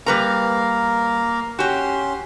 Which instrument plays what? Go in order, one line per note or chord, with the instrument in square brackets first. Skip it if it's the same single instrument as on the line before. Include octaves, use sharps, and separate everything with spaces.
[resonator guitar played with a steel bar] G3 B4 A#5 [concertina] A#3 A#4 F5
[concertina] C#4 C6 [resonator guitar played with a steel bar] F#4 G4